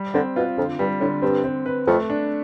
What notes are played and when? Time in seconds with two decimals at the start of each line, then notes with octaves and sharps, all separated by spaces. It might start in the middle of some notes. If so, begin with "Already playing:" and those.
Already playing: G3
0.14 D3 C4
0.36 B2 F4
0.57 F2 D3
0.79 G2 G3
1.00 A2 D3
1.22 G2 C4
1.44 C4
1.66 B4
1.87 F2 A3
2.10 D4